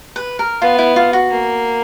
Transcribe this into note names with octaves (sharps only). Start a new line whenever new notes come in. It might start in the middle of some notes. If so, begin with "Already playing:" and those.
B4
A#4
B3 F4
E4
F4
F#4
A#3